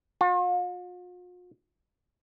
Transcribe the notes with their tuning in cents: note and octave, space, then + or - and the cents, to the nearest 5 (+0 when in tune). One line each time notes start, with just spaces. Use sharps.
F4 +45